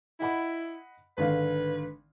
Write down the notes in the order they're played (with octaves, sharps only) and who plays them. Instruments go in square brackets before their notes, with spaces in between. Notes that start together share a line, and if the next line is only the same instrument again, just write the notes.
[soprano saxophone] E4 [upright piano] D#5 F#5 B5
[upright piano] G#1 D3 F5 [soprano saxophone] B4